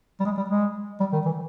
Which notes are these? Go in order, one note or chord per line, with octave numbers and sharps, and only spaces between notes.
G3
G#3
G3
G#3
G3
D#3
E3